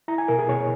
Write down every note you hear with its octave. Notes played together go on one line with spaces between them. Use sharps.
E4 A#5
G#5
B2 A#4
G#4
B2 C#5